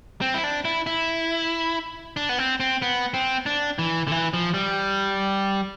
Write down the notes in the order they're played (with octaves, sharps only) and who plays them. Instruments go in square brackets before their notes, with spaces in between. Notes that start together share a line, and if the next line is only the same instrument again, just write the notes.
[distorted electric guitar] C4
E4
D4
E4
E4
D4
B3
C4
C4
B3
C4
D4
E3
D3
E3
F3
G3